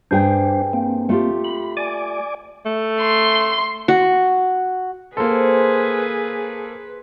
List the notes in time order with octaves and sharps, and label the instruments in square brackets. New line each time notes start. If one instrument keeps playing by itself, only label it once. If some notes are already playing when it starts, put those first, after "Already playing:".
[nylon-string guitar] G2 G#4 G5 [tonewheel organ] D4 C5
[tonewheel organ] A#3 C4
[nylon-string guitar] A3 F4 G4
[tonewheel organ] B5
D5 G#5 D6
[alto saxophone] A3
[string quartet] C6
[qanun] F#4
[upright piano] A#3 A4 [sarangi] G#4 [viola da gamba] B4 [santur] C5